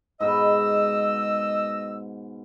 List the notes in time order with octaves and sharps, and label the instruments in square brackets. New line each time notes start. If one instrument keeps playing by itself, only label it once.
[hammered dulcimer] G#2 B2 B4 [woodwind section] D#5 E6